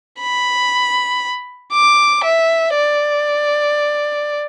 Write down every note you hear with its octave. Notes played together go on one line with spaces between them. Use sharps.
B5
D6
E5
D5